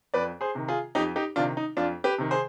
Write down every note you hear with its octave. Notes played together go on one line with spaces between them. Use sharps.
F2 B4 D5
G#4 C5
C3 D#3
F4 G#4
F2 D#4 G4
D#4 G4
C3 D#3 D4 F4
D#4
F2 D4 F4
G4 B4
C3 D#3
G#4 C5